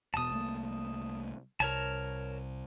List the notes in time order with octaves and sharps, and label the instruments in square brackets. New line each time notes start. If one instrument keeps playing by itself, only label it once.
[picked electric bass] E1 B2 [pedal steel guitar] A5 D#6
[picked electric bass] C2 A3 A#3
[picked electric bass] C2 [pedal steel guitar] A#4 C#5 A5